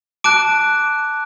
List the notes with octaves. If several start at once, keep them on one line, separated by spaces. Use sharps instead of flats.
A5 D6 F#6 D7